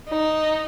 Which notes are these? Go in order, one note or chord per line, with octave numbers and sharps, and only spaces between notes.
D#4